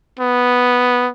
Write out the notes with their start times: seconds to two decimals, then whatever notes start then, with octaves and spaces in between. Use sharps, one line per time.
0.19 B3